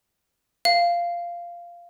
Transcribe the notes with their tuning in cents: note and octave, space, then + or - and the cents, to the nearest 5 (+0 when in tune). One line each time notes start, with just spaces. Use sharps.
F5 -10